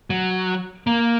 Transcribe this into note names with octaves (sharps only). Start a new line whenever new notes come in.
F#3
A#3